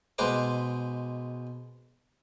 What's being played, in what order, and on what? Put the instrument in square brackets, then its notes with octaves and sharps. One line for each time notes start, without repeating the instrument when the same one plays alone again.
[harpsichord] B2 G#3 B4 C5 A#5 D6